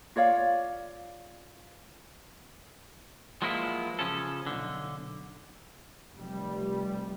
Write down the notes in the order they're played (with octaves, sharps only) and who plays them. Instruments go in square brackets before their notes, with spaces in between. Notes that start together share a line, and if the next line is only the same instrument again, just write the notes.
[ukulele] F4 C#5 D5 F5
[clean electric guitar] F3 F#3 G#3 A#3 B3 E4
C#3 F3 C#4 A4
B1 D3
[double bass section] F1 G3